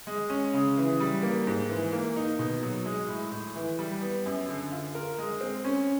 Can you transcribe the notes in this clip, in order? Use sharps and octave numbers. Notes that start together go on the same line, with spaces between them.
G#3
C#4
C#3
E3
G3
A#3
G#2
E3
A#3
D#4
B2
F#3
G#3
A2
A2
E3
G3
B3
F#2
D3
F4
A#4
G#3
C4
C#4